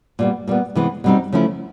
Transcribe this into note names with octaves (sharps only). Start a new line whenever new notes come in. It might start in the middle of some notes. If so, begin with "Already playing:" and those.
A#2 G3 B3
A#2 G3 B3
C3 E3 G#3 B3
B2 G3 C4 D#4
C#3 F3 A3 C#4 E4